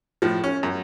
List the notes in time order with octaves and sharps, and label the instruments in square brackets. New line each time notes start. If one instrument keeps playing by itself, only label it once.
[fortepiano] A2 F3
C#4
F#2